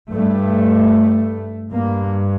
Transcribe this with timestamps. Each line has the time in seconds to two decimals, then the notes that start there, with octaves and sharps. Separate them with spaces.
0.11 G2 A3
1.70 G2 A#3